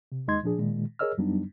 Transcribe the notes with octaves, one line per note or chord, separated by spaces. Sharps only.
C3
D#2 G#3 D#4 D#5 C6 G#6
A#2 F3 D4 G#4
A#2 D#3 G#3
G#4 A#4 C#5 D#5 E6 F6
F#2 F#3 G3 B3 D4 D#4